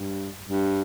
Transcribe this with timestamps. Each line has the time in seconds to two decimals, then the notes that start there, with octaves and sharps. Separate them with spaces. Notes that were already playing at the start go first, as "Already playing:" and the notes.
Already playing: G2
0.46 G2